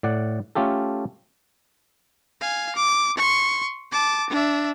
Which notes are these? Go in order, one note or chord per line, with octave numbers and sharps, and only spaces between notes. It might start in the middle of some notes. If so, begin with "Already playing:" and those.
A2 D5 F#5
A3 C#4 F4 G4 A4
F5 G#5
D6
C6 C#6
A5 D6
D4 E5